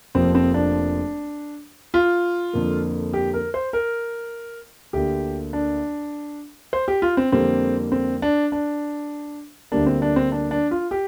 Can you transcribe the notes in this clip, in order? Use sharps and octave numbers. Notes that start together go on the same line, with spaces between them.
F1 F2 F3 A#3 C4
C4
D4
F4
F2 D3 A#3
G4
A#4
C5
A#4
D2 D3 A#3 G4
D4
C5
G4
F4
C4
F2 D3 G3 A#3 C4
C4
D4
D4
D2 D3 G3 A#3 D4
C4
D4
C4
D4
D4
F4
G4